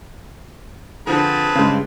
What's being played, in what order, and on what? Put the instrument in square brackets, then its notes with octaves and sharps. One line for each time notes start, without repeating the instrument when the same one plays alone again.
[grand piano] D3 F3 [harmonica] C4 B4 A5 [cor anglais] G#4
[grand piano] G2 F4 [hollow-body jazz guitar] C#3 G#3